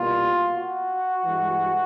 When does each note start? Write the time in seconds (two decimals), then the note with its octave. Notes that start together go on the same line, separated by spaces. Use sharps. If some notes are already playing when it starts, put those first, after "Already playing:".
Already playing: C2 B2 G3 A#3 F4
0.52 F#4
1.24 G2 E3 G#3